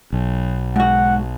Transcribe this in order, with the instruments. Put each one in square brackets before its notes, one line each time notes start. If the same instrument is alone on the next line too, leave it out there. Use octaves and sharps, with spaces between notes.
[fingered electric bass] B1
[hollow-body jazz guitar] G#2 F#4 [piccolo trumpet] F#5